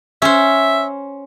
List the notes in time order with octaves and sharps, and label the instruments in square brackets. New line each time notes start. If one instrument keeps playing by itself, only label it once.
[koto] C#4 C5 [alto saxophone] E5